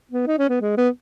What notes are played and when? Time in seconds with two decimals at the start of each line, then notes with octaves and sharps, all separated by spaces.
0.11 B3
0.27 D#4
0.38 C#4
0.49 B3
0.61 G#3
0.77 B3